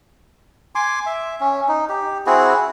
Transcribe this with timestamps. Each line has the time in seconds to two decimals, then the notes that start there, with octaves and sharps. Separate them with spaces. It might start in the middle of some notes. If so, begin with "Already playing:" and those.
0.75 G#5 C6 D6
1.06 E5
1.41 C#4
1.68 D#4
1.89 G4
2.26 C4 E4 F#4 G#4